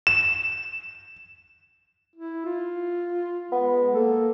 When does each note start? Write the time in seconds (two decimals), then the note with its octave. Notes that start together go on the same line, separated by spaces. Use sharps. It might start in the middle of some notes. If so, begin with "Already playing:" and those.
0.07 E7
2.16 E4
2.46 F4
3.52 G#3 B3
3.95 A#3 A4